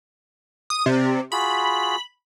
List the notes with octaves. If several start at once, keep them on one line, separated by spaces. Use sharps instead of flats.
D#6
C3 D5
F4 F#4 G#4 B5